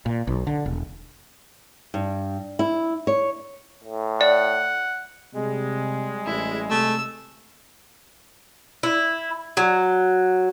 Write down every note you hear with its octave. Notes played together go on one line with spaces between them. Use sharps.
A#2
B1
D3
E1
G2
E4
C#5
A2
D5 F#5
C3 G3 G#3
A1 E4
C3 A3 E6
E4
F#3